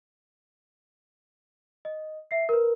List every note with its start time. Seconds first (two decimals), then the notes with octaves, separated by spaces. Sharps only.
1.85 D#5
2.31 E5 C7
2.49 A#4 B4